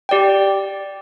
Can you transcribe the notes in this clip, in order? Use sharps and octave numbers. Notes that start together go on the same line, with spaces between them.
G4 D5 G5